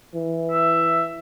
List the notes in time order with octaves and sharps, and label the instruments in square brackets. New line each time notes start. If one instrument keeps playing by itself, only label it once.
[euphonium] E3
[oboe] E5